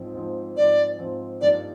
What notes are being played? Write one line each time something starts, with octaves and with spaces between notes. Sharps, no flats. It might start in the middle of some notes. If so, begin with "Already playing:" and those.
Already playing: G#2 F3 C4
G#2 F3 C4
G#2 F3 C4 D5
G#2 F3 C4
G2 F3 A#3 D#4 G4 D5